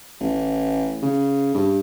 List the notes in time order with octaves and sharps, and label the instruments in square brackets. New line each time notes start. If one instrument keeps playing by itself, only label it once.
[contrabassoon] A1
C#3
G2